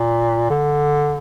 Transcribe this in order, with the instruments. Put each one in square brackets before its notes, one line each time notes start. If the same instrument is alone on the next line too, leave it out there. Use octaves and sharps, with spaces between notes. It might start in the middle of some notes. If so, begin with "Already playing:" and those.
Already playing: [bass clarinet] A#2
D3